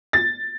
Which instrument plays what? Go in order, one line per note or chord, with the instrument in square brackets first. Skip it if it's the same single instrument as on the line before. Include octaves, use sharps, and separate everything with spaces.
[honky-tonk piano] A6